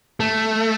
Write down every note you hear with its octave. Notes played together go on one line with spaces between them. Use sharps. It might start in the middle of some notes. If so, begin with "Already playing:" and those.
A3